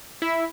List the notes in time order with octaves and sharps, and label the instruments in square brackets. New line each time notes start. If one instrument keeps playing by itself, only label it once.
[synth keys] E4